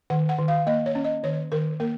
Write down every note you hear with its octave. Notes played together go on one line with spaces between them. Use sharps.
D#3 F#5
F#5
D#3
F5
A#3 D#5
C#5
C#4
D#5
D#3 C#5
D#3 A#4
A#3 A#4